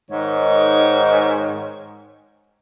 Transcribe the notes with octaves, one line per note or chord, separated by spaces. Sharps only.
G#2 D#3 C#5